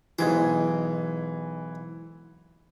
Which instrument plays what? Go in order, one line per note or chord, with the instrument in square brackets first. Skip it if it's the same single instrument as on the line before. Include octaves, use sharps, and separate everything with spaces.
[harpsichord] B1 G#2 C5 [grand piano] E3 G#6